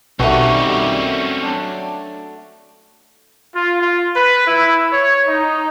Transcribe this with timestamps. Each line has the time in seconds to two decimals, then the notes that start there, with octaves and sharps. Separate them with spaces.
0.19 B1 D#3 G3 A3 C4 C#4 F#4
1.43 F#3 D4
3.53 F4
3.82 F4
4.16 B4
4.47 E4
4.92 C#5
5.27 D#4